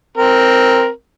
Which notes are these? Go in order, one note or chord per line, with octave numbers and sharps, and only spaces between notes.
C4 A#4